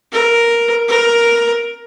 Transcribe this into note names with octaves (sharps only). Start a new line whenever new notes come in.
A#4
A#4